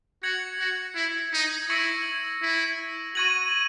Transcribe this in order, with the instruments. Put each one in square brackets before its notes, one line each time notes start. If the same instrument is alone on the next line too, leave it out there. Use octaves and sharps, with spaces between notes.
[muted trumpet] F#4 [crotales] G#6 C#7 F#7
[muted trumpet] F#4
E4
D#4
[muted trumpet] E4 [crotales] C#6 E6 A#6 C#7 F#7
[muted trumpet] E4
[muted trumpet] F#4 [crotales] C#6 G#6 D#7 F#7